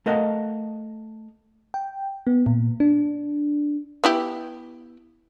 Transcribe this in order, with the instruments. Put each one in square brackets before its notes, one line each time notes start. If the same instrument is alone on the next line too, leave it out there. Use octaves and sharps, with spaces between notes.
[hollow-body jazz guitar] A3 A#4 D#5 F5 F#5
[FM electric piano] G5
B3
A#2
D4
[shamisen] B3 E4 G4